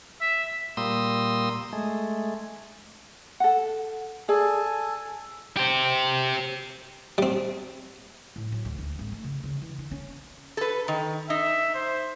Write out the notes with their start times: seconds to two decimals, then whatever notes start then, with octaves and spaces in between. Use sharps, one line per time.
0.21 E5
0.77 A#2 G3 A#3 C6 D#6 E6
1.73 G#3 A3
3.40 A4 F#5
4.29 G#4 A4 D5 G#5
5.57 G4 C5
7.18 G3 C4
8.36 A2
8.52 F#3
8.65 D2
8.78 D2
8.99 G#1
9.12 A3
9.24 C#3
9.44 C#3
9.61 E3
9.78 D3
9.91 C#4
10.57 A4 B4
10.88 D#3
11.30 D#4 E5
11.75 C5